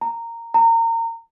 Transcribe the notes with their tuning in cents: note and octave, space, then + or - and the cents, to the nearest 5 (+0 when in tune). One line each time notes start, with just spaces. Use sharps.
A#5 -15
A#5 -30